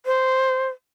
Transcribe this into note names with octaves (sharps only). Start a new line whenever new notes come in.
C5